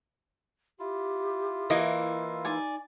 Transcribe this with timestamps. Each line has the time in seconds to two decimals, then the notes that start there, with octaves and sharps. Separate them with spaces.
0.79 E4 F4 G4
1.70 E3 A#3 D#5 D#6
2.45 D#4 D5 G#5